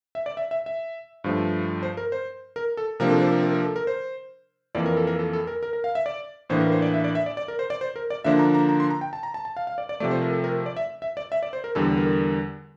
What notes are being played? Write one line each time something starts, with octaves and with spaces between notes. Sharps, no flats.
E5
D5
E5
E5
E5
G2 F3 A3
C5
A#4
C5
A#4
A4
C3 F3 A#3 D4 A#4
A4
C5
A#4
A#4
A#4
A4
A#4
C5
F2 E3 A#3 D5
A#4
A4
A#4
A4
A4
A#4
A#4
A#4
F5
E5
D5
A2 E3 A#3 D4 C5
A#4
C5
D5
E5
D5
E5
D5
D5
A#4
C5
D5
C5
A#4
D5
D3 F3 A#3 D4 E5
A#5
A#5
A#5
C6
A#5
G5
A5
A#5
A5
A5
F5
F5
D5
D5
C3 F3 A3 D5
C5
A#4
A4
A#4
D5
E5
E5
D5
E5
D5
C5
A#4
E2 D3 G3 A4
A#4